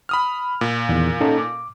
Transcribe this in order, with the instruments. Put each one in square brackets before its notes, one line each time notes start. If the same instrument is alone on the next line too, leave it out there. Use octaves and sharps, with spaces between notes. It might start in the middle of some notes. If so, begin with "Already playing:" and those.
[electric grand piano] B5 D#6 F6
A#2
[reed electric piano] E2 D#3
C#4 D#4 A4
D6